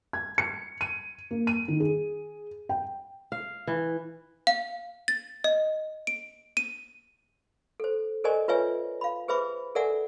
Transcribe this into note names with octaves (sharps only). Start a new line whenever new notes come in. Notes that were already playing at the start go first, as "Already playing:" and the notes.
G#6
C#7
D#7
A#3
D#7
D#3
G#4
G5
F5
E3
F5
A6
D#5
D7
D#7
A4 C5
A4 A#4 C5 D5 D#5 G#5
F4 B4 C#5 E5 G#5
F5 B5
G#4 B4 C5 E5 B5 D6
A4 A#4 D5 E5 F#5 G#5